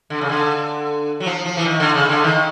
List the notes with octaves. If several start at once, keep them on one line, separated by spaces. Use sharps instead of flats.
D3
C#3
D3
F#3
F3
F3
E3
D#3
D3
C#3
D3
D#3